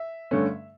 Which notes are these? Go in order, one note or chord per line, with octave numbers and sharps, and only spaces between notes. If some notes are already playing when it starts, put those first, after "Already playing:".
Already playing: E5
G2 D3 A3 C#4